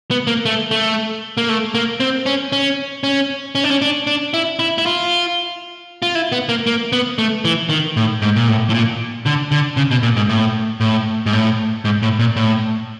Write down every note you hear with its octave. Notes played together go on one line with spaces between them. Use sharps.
B3
A#3
A3
A3
A#3
A3
A#3
C4
C#4
C#4
C#4
C#4
D4
C#4
D4
D4
E4
E4
E4
F4
F4
E4
B3
A#3
A#3
B3
A3
E3
D#3
A2
G#2
A#2
A2
A2
A#2
D3
D3
C#3
B2
A#2
G#2
A2
A2
G#2
A2
G#2
A2
A#2
A2